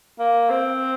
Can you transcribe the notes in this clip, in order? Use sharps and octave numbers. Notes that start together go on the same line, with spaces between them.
A#3
C4